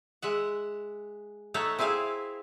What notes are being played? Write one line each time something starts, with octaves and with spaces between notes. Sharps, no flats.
G#3 E5 F#5
A3 D#4 C#5 E5 F#5
C4 E4 G#4 E5 F5